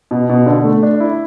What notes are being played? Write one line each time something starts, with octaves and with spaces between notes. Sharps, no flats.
B2
B2
D3
A3
D4
E4